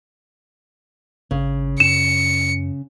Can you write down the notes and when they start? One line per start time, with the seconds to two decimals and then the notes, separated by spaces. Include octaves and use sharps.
1.31 G#1 C#3
1.80 F#2 C#7 E7